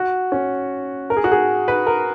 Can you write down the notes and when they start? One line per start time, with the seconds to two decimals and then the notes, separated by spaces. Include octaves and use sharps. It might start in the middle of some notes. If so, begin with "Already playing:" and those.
Already playing: F#4
0.32 C#4
1.10 A#4
1.17 G#4
1.24 F#4
1.32 G#4
1.68 B4
1.87 A#4